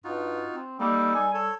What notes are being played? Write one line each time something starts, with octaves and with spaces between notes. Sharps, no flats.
G2 D#4 F4 F#4
C4
G3 A#3 D#4 A4
G3 G#5
A4 C#5